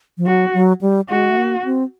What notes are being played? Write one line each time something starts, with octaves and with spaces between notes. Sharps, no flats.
F3
F#3 F#4
F#3
G3
G#3 F#4
A3
A#3
C4